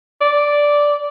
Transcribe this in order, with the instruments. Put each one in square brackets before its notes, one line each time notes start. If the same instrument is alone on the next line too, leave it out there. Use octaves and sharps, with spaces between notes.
[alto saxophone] D5